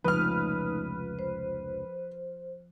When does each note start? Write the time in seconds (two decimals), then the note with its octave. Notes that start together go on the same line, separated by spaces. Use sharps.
0.04 F1 C#2 F3 A3 D#4 B4 D#6 F6
1.19 C5